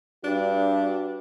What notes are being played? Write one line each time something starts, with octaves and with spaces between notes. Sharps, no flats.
G2 D4 F#4